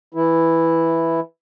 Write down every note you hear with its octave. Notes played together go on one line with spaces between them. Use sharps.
E3 E4